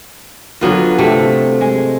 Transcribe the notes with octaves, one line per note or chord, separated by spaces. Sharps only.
D3 F#3 B3 F4
C3 A3
G#3